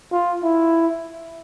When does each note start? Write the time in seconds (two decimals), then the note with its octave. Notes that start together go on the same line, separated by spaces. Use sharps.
0.12 F4
0.43 E4